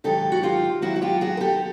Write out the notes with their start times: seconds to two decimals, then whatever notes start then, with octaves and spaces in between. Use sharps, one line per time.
0.04 G#2 D#3 F#3 G4 A4
0.32 F#4
0.43 F4 G4
0.82 G#2 D#3 F#3 E4 F#4
0.96 F#4
1.02 F4 G4
1.21 F#4 G#4
1.37 A#4
1.40 G4 A4